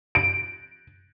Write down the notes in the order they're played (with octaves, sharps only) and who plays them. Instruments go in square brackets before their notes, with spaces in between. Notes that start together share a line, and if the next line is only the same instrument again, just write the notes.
[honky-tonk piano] D7